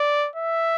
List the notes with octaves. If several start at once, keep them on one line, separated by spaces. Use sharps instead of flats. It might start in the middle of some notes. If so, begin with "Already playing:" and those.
Already playing: D5
E5